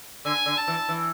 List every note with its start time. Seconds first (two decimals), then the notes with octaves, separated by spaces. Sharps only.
0.25 D3 G#5
0.46 D3
0.57 A5
0.68 E3
0.89 E3